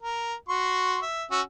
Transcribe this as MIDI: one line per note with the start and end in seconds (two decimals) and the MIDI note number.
0.02 0.34 70
0.49 1.01 66
0.49 1.01 84
0.49 1.01 85
1.02 1.24 76
1.31 1.41 61
1.31 1.41 66
1.31 1.41 88